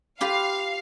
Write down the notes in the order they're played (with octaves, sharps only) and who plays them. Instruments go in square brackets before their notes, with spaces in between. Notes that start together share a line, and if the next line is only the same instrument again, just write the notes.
[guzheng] F4 G4 B4 [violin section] F5